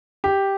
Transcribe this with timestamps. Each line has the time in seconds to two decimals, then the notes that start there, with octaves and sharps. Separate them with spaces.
0.24 G4